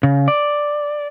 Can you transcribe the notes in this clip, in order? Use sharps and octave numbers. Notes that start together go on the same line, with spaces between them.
C#3
D5